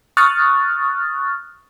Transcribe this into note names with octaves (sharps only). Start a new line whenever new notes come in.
C#6 D#6 F6 F#6 A6